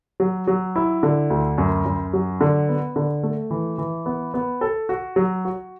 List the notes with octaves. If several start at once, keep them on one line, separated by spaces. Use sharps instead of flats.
F#3
F#3
E4
D3
D2
F#2
F#2
F#3
D3
B3
D3
A3
E3
E3
B3
B3
A4
F#4
F#3
F#4